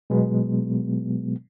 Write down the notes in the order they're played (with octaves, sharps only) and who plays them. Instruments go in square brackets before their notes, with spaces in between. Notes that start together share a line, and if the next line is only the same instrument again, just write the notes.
[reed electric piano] B2 F#3 G#3 B3